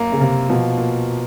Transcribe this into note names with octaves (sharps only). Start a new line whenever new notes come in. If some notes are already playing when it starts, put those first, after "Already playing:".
Already playing: F#2 A#3
C#3
C3 A#3
B2 F3
A#2